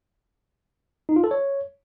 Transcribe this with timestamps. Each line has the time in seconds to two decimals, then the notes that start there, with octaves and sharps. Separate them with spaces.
1.09 D#4
1.16 F4
1.24 A4
1.31 C#5